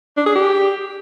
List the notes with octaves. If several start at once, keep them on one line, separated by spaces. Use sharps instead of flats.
D4
G#4
G4